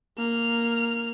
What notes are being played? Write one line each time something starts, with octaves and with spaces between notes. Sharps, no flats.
A#3 F6